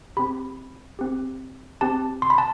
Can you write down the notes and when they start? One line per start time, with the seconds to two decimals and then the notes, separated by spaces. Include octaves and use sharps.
0.17 C4 G4 B5
0.99 C4 G4
1.81 C4 G4 A5
2.22 C6
2.30 B5
2.38 A5